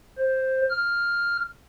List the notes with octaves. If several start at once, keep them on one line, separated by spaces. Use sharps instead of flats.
C5
F6